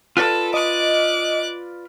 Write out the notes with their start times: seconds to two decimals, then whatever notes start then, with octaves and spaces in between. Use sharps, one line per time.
0.17 F4 A4 B4 D5
0.54 D#5 D6 F#6